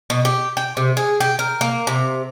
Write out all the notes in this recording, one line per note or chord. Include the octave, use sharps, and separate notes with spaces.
B2
G4
G5
C3
G#4
G4
A#4
A#3
C3